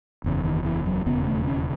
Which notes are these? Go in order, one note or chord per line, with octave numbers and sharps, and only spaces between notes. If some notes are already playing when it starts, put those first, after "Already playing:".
F#1 E2 C#3
D#3
E3
F#3
E1 D#2 C#3 B3
A3
C#4